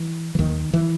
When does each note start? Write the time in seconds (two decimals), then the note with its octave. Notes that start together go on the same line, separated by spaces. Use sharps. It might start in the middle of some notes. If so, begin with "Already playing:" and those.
Already playing: E3
0.35 E3
0.39 D#2 D#3
0.73 E3